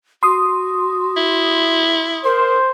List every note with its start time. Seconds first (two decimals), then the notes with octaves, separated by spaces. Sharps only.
0.23 F#4 C6 D#6
1.17 E4
2.24 A#4 C5